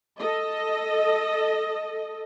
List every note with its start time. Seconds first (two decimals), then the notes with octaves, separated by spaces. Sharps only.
0.18 A4 D#5